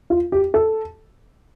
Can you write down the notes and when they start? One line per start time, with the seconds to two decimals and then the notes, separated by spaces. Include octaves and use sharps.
0.10 F4
0.32 G4
0.54 A4